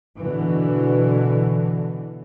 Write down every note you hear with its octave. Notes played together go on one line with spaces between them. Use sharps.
B2 D3 E3